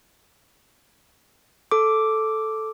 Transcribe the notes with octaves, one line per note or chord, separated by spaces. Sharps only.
A4 D6